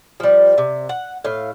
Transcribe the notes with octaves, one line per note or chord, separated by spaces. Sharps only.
F3 G3
C3
F#5
A2 F5